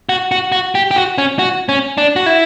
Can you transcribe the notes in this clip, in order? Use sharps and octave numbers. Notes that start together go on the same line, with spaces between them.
F#4
F#4
F#4
G4
G4
F#4
C#4
F#4
C#4
D4
F#4
E4